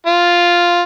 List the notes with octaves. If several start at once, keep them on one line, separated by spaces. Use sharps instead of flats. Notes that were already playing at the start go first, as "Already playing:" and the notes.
F4